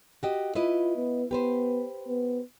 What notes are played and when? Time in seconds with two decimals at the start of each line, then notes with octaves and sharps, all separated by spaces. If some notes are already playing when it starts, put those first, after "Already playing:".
0.23 F#4 G4 D#5
0.55 E4 F4 B4 D#5
0.96 B3
1.31 B3 G4 B4 C5
2.08 B3